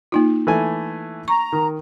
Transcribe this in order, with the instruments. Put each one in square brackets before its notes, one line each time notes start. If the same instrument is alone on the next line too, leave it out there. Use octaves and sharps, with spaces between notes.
[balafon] A#3 D#4 F4
[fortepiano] E3 A3 G#5
[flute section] A#5 [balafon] C#6
[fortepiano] D#3